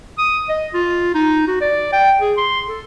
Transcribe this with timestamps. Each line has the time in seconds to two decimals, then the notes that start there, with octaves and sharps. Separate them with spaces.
0.18 D#6
0.49 D#5
0.74 F4
1.14 D#4
1.47 F#4
1.61 D5
1.92 G5
2.21 G#4
2.38 C6
2.67 A4